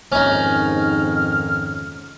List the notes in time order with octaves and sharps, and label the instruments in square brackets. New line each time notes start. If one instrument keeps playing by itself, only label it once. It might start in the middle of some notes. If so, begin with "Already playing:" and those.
[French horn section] F2 G#2 D#3 [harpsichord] C#4 D#4 [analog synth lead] F6